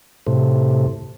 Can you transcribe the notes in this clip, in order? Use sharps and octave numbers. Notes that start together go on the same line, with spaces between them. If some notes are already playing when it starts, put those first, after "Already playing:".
A2 C3